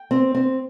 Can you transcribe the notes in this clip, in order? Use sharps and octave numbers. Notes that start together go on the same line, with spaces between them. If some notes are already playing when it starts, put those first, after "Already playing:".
Already playing: G5
C4
C4